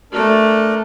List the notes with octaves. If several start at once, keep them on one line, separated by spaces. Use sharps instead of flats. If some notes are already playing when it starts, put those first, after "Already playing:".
A3 D4 A#4